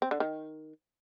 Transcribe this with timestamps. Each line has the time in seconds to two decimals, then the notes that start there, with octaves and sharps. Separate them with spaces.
0.02 C4
0.11 D3
0.20 D#3